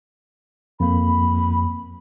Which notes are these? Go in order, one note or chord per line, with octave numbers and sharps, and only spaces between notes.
F2 A#3 B5